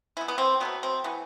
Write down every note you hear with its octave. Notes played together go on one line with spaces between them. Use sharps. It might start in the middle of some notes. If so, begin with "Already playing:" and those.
E3 B3 E4
B3
C4
B2 F#3 A3 B3
C4
E3 A3 B3